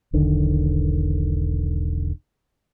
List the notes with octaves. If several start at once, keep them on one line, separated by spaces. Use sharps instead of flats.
E1 B1 D3 D#3